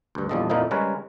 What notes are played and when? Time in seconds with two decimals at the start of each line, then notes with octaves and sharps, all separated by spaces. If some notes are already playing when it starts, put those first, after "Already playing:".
0.15 D2 G2
0.29 A#1 E2 F3 G3 A4 D#5
0.50 F2 A#2 F3 A#3 D#4 E4
0.71 C#3 G3 G#3 A#4 B4 C#5